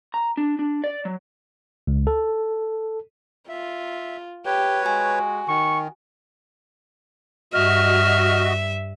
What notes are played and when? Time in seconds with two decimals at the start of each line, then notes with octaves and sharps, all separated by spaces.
0.14 A#5
0.37 D4
0.59 D4
0.84 D5
1.05 F#3
1.87 C#2
2.07 A4
3.49 F4 E5
4.46 G4 B4 C#5
4.86 G#3 F#4 G#5
5.48 D#3 C#6
7.53 G2 F#4 D#5 E5 F6